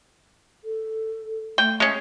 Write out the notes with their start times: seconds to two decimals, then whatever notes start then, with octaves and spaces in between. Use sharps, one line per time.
0.64 A4
1.58 A3 G5
1.80 G#3 C#4